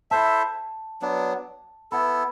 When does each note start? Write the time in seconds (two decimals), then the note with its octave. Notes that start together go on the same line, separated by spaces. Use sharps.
0.11 E4 A4 C5 E5 A5
1.02 F#3 B3 D4
1.92 B3 E4 A4 B5